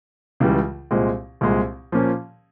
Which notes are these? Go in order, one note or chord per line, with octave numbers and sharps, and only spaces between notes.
C#2 C#3 E3 G3
C2 A#2 G#3 C4
C2 A#2 G#3 C4
A#2 F3 A#3 C#4